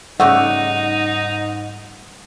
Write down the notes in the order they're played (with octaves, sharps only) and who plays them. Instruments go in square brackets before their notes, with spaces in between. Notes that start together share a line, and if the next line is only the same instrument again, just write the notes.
[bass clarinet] G#2 [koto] C#3 G3 A3 [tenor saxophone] D#4 [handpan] F#5